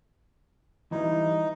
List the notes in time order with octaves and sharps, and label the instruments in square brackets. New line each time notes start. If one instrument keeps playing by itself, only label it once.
[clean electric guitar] E3 G3 E4 [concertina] D#4